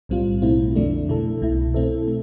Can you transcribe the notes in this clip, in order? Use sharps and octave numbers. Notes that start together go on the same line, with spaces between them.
B1 A2 G3 C4 F4
B1 B2 A3 C4 E4
F2 D3 F3 A3 D4
B2 A3 E4 A4
C2 B2 A3 E4
B2 A3 C4 E4 A4
A3